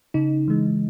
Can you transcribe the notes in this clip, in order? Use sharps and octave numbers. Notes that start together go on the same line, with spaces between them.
C#3 D#4
E3 G#3